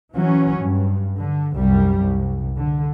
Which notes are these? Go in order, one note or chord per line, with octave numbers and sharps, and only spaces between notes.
E3 F#3 C#4
G2
D3
C2 F#2 G3
C2
D3